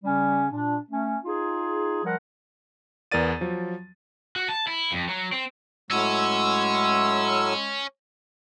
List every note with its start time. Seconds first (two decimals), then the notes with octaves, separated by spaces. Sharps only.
0.03 C#3 G3 C#4
0.51 A#2 D4
0.90 A3 C#4
1.24 D#4 F4 G#4
2.04 F3 G3 A#4 F#5
3.12 E2 B3 A#4 D5 A6 D#7
3.41 F3 F#3
4.36 F#4
4.49 A5
4.67 E4
4.92 F2
5.09 F#3
5.32 C4
5.91 A2 F#3 G#3 C#4 E6